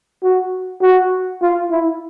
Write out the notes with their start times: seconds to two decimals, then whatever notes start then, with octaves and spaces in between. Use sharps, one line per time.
0.23 F#4
0.82 F#4
1.41 F4
1.71 E4